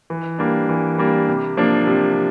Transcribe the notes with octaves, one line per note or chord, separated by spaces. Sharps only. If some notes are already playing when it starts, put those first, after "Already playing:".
E3
G3 A#3 D4
E3
G3 A#3 D4
C3
F3 A#3 D4
C3